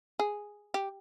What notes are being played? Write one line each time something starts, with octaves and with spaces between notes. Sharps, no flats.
G#4
G4